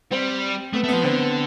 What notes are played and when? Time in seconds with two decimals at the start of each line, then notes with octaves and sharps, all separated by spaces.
0.11 G3 C4
0.73 A3 B3
0.84 A3
0.89 F3 B3
1.04 D3 C4
1.19 B3